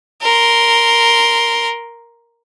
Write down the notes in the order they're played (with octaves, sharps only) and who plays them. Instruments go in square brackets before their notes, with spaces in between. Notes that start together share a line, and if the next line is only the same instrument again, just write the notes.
[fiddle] A#4 C6